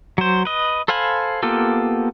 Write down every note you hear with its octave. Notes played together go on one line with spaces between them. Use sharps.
F#3 C5
B4 D#5
A4 C5 F5 G#5 B5
A#3 B3 F4 G4 A4